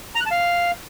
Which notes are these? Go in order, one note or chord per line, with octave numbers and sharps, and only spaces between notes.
A#5
F#6
A5
F5